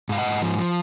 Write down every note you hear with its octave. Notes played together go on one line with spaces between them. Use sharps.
G#2 F5
D#5 F#5
G#2
F3
F3